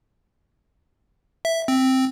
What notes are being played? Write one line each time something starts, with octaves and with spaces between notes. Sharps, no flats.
E5
C4